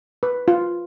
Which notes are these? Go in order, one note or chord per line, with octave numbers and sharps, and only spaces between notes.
B4
F4